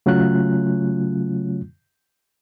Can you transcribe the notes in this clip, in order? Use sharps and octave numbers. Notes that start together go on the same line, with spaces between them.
C#3 F#3 A3 C#4 F4 F#6